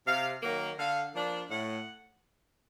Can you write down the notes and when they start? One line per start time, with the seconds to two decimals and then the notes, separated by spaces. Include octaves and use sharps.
0.07 C3 F5
0.43 D#3 F#3 A#3
0.79 D3 F5
1.14 F3 A#3 D4
1.50 A2 F#5